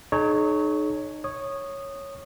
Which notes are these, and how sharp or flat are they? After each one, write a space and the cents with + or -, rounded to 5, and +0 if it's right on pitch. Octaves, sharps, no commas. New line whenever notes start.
D#4 -30 G#4 +45 C#5 +0
C#5 -5 D#6 -15